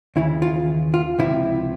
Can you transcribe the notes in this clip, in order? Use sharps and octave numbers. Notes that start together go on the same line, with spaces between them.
D#2 C#3 E3 E4
F4
F4
C#2 C3 F3 E4